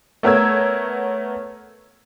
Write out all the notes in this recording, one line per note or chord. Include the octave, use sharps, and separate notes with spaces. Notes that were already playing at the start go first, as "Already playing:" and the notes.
A3 B3 A#4 C#5 E6 G#6